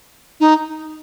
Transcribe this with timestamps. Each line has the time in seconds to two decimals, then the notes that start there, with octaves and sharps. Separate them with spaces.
0.40 D#4